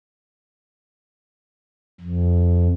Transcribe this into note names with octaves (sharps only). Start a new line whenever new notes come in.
F2